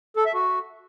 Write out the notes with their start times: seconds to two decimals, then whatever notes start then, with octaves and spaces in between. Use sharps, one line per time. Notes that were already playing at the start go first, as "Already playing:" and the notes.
0.17 A4
0.26 E5
0.34 F#4